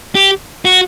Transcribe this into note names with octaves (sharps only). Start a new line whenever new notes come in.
G4
F#4